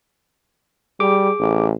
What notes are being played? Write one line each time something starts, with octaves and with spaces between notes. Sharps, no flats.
G3 G#4 D6
A1